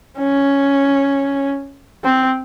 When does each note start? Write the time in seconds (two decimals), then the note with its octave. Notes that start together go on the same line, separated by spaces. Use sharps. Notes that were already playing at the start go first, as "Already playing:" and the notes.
0.18 C#4
2.04 C4